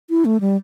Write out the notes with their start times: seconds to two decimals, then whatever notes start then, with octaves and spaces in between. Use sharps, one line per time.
0.10 E4
0.25 A3
0.40 G3